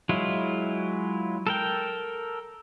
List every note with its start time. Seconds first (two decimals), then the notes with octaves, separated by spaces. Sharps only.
0.09 F#3 G#3 E4 F4
1.47 A4 A#4 G5